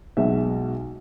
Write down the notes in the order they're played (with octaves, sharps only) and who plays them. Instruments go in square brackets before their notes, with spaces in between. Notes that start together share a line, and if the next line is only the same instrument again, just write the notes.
[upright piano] B1 B2 G#3 E5